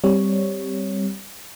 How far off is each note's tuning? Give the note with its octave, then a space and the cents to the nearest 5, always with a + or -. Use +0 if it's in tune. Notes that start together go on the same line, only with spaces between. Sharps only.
G3 +0 C4 +0 C#5 +0